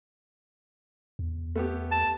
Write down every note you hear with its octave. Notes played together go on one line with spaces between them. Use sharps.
E2
A3 B3 G4
A5